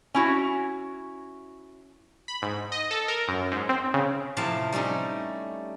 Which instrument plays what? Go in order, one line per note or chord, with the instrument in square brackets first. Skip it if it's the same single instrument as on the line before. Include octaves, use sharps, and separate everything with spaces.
[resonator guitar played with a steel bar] C#4 E4 F#4
[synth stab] B5
G#2
D#5
A4
A#4
F#2
G#2
C4
C#3
[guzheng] A2 C3 F3 E4 F5 A5
G3 A3 C#4 D#4